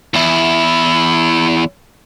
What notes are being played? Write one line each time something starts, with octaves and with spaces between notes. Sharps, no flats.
E2 E4